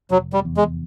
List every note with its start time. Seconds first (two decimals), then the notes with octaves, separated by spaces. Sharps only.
0.10 F1 F#3
0.33 G3
0.45 E2
0.57 G#3